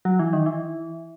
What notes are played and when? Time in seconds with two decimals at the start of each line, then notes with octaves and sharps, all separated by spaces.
0.05 F#3
0.19 E3
0.33 D#3
0.46 E3